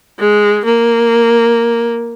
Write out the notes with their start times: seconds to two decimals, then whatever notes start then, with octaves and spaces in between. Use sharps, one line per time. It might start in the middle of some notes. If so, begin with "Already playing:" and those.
0.19 G#3
0.65 A#3